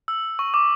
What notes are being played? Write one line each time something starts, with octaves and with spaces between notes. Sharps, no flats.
E6
C#6
D6